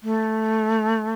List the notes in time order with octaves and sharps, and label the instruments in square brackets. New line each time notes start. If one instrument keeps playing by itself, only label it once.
[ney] A3